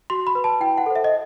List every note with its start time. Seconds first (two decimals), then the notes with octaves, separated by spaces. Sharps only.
0.10 F#4 C6
0.27 B5
0.35 B4
0.44 A5
0.61 E4 G5
0.78 F#5
0.86 A4 C5
0.96 E5
1.04 D#5